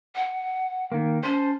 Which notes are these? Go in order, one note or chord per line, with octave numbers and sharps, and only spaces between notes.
F#5
D#3 A#3
C#4 C5 A5